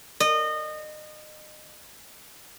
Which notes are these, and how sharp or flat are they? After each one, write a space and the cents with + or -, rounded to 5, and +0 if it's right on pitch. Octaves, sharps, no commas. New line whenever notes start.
D#5 -25